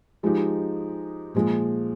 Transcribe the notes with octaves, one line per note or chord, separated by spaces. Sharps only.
F3 G#3 D#4 G4
A#2 F3 G#3